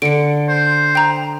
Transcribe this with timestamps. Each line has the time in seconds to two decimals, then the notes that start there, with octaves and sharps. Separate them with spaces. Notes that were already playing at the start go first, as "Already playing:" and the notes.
0.02 D3 C#7 D7
0.49 C5
0.95 G5 A#5